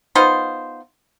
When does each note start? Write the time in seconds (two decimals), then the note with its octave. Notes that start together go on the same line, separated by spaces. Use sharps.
0.15 B3 D#4 F4 C5